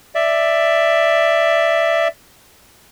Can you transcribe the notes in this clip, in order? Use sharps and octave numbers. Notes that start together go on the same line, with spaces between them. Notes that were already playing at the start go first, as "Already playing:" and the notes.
D5 E5